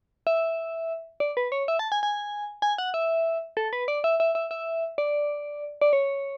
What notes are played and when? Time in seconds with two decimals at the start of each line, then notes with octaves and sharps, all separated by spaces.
0.27 E5
1.20 D5
1.37 B4
1.52 C#5
1.68 E5
1.79 A5
1.92 G#5
2.03 G#5
2.62 G#5
2.78 F#5
2.94 E5
3.57 A4
3.73 B4
3.88 D5
4.04 E5
4.20 E5
4.35 E5
4.51 E5
4.98 D5
5.81 D5
5.93 C#5